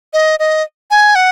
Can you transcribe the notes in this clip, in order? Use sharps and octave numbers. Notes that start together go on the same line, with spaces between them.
D#5
D#5
G#5
F#5